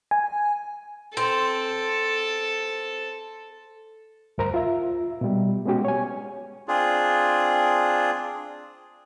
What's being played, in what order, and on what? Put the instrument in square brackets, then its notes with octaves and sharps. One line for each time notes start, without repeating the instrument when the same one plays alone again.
[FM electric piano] G#5
[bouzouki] C4 [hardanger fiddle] A4
[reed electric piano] D2 G2 A#4 C5 A#5
F4 E5
B2 G3
G#3 B3 C#4 F#4 G4
C#5 G#5
[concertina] C4 D4 F4 G#4